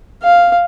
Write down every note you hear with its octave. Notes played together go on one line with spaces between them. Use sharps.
F5